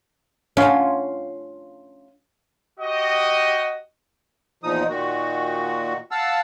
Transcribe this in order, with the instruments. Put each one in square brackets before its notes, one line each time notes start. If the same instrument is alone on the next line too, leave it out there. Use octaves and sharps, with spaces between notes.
[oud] C#4 F4
[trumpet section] F#4 G4 D#5
[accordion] E2 A#2 F3 D#4 D#6
A#2 D#3 F#4
F5 F#5 A5 E6